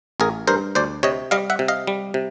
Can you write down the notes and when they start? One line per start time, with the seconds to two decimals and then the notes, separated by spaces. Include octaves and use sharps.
0.20 A1 G#4 A#4
0.47 G2 A#4 C5
0.75 D2 C5 D5
1.03 C3 C#5 D#5
1.31 G3 D#5 F5
1.50 E5 F#5
1.59 C3
1.68 D#5 F5
1.87 G3
2.14 C3